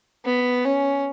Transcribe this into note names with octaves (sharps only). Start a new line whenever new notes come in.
B3
C#4